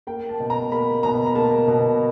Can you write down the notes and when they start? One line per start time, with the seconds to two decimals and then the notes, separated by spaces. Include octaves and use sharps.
0.07 A#3 G5
0.29 A5
0.40 B2
0.50 A#5
0.72 A#3 B5
1.03 B2 A#5
1.27 A#5
1.35 A#3 A5
1.67 B2